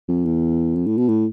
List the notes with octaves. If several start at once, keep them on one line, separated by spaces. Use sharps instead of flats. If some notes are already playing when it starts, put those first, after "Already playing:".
F2
E2
F2
A2
B2
A2